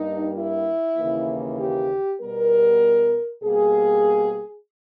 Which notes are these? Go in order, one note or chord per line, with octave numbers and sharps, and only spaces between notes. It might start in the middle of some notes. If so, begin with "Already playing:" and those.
Already playing: G2 G3 A#3 D#4
E4
D#2 C#3 E3 A#3
G4
B2 G3 B3 A#4
B2 G3 A#3 G#4